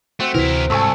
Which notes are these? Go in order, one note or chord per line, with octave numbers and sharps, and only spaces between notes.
A3 C4 F#4
D2 C3 E3 E4 A#4
C2 G#2 A4 G#5 C#6 E6